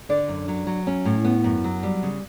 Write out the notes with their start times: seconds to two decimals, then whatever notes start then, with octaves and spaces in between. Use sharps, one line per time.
0.09 D3 D4 D5
0.28 F#2
0.48 F#3
0.67 F#3
0.87 C#4
1.05 A2
1.25 B3
1.44 F#2
1.64 F#3
1.83 G3
2.03 C#3